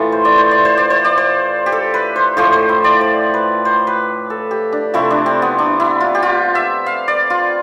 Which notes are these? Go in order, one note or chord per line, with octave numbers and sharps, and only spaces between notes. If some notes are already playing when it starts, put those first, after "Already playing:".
Already playing: A2 E3 A3 F4
C5
D5
C5
D5
C5
D5
C5
D5
C5
G4
A4
B4
C5
A2 F3 A3 C5
C5
E4
D5
C5
B4
C5
B4
A4
G4
D4
C3 F3 A3 E4
D4
C4
B3
D4
E4
F4
G4
F4
E5
F5
D5
F4